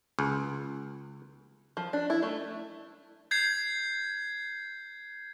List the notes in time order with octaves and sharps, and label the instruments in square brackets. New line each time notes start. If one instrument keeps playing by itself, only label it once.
[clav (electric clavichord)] C#2
[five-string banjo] F3
D4
E4
A3
[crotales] G6 G#6 C7